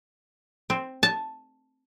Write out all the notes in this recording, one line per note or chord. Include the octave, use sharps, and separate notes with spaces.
C4
A5